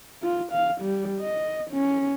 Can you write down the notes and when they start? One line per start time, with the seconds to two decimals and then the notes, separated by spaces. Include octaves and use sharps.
0.23 F4
0.52 F5
0.81 G3
1.21 D#5
1.71 C#4